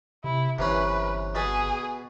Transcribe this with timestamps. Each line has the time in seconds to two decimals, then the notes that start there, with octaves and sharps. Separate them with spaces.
0.24 C3 E4
0.59 G1 C3 E3 C#4 B4
1.35 B2 G#4 A5 B5